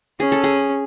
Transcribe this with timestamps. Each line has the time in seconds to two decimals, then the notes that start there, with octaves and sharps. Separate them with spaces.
0.20 C#4 G#4
0.32 A4
0.44 G#4